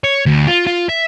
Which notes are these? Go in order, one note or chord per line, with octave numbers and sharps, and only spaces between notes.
C#5
D2
F4
F4
E5